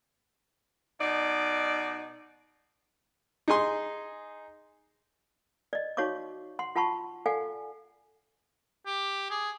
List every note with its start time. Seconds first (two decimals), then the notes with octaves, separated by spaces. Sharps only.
1.00 B2 D#4 D5
3.48 D#4 G#4 G#5 C6
5.73 D5 D#5
5.97 D#4 F#4 C#5 F5 C#6 D6
6.59 F#5 C6
6.76 F4 F#5 A5 B5 C#6
7.26 A4 D5 F5 F#5 G#5
8.86 G4
9.30 G#4